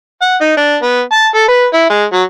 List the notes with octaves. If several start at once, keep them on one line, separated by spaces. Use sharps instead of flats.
F#5
D#4
D4
B3
A5
A4
B4
E4
G#3
F#3